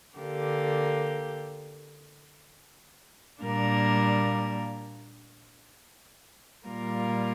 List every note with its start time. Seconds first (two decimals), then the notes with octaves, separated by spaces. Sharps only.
0.18 D3 A#3 G4
3.43 A#2 G3 A#3 D4 A#4
6.67 A#2 G3 A#3 F4 A#4